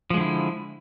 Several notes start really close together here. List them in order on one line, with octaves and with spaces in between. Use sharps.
F3 G#3 D3 E4